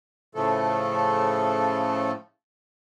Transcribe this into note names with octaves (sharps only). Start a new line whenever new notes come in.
A2 C#3 F3 A3 A4